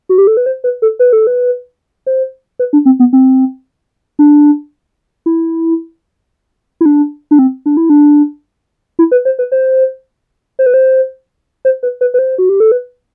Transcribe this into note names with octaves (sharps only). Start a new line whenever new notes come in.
F#4
G4
A4
B4
C5
B4
A4
B4
A4
B4
C5
B4
D4
C4
B3
C4
D4
E4
E4
D4
D4
C4
D4
E4
D4
E4
B4
C5
B4
C5
C5
B4
C5
C5
B4
B4
B4
C5
F#4
G4
A4
B4